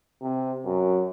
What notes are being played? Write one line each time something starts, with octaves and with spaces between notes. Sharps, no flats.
C3
F#2